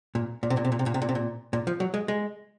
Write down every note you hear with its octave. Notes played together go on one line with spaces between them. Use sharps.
A#2
A#2
C3
A#2
C3
A#2
C3
A#2
C3
A#2
C3
A#2
A#2
F3
F#3
G#3
G#3